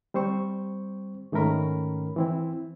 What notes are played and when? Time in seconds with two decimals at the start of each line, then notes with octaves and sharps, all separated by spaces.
0.14 G3 C4 C5 C#6
1.32 G#2 D#3 A3 C#4 A#4 B5
2.16 E3 C4 E4